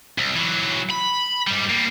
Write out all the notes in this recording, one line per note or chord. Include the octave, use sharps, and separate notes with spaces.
C2
E3 F#3
B5
G#2 G3
G3 A#3